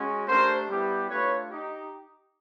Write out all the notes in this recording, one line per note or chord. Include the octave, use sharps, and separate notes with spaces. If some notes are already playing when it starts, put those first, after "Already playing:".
Already playing: G#3 C#4 F#4
A3 D4 G4 A#4 C5
G3 B3 E4 G4
A3 D4 F4 B4 C#5
D#4 G4